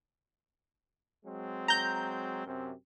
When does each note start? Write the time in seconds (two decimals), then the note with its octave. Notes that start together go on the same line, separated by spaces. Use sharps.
1.25 F#3 G#3 C4
1.68 A#5 G6
2.46 F#2 C3 C4